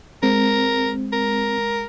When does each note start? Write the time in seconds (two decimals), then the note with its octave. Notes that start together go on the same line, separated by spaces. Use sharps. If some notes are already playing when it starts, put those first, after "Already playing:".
0.23 G#3 C4 A#4
1.13 A#4